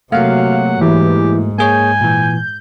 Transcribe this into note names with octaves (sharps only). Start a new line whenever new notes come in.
C3 F#3 A3 A#3 F#4 F5 F#5
G#2 E3 G4
A#3 G#4 C#5 G#5 G6
A#2 E3